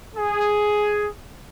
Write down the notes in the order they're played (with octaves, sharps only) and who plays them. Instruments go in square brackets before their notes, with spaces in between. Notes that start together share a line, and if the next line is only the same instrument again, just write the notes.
[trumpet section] G#4